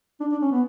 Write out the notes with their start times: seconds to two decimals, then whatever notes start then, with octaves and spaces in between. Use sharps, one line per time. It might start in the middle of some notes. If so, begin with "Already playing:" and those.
0.20 D4
0.32 D4
0.42 C#4
0.52 B3